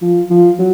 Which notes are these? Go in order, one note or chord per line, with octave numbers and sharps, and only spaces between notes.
F3
F3
F#3